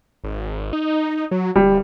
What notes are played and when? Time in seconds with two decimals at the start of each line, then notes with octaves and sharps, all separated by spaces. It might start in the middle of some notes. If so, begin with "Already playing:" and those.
0.24 G#1
0.73 D#4
1.31 F#3
1.56 D1 G3